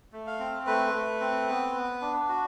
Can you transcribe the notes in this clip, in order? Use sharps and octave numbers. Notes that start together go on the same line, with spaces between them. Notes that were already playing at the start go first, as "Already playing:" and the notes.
A3
F5
C4
A3 B4
A3
C4
B3
B3
D4
F#4